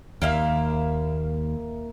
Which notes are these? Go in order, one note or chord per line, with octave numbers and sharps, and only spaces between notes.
D#2 A#3 E5 F5